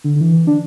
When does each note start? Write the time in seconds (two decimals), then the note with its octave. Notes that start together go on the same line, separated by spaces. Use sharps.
0.04 D3
0.16 D3
0.21 E3
0.47 D4